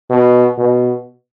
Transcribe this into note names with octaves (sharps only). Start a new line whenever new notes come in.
B2
B2